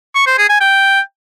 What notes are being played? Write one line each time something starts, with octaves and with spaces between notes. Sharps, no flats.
C#6
C5
G#4
G#5
G5